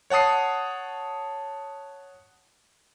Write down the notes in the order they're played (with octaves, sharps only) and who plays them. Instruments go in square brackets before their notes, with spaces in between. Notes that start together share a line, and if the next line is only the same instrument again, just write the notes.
[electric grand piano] C#5 F#5 A5 D#6 C7